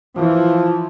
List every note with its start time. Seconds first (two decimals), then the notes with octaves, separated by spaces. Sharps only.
0.17 E3 F3